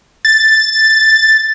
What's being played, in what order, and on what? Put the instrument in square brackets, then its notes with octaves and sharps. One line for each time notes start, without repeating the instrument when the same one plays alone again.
[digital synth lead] A6